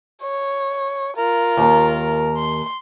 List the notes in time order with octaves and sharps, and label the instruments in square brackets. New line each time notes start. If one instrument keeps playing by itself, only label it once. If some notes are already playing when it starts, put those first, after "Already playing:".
[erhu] C#5
[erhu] F4 [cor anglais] A#4
[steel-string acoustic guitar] D#2 A#5
[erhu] C6